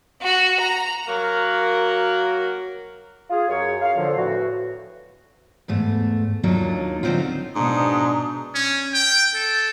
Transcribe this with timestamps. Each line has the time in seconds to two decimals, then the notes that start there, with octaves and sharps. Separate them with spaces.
0.22 F#4
0.60 A#5
1.07 F#3 A#3 F#4 A#4
3.30 F4 G#4
3.49 F#2 C#5
3.81 F5
3.97 A#2 D3 F3
4.17 E2 A2 F#4
5.68 E2 G#2 A3
6.43 D#2 F#3 A#3 D4 D#4 F4
7.03 D3 F#3 G3 C4 D#4 F4
7.56 G#2 B2 D4 A#5 D#6
8.55 C#4
8.94 G5
9.35 A4